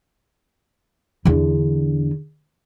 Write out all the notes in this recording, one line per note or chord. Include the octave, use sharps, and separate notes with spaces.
E2 D3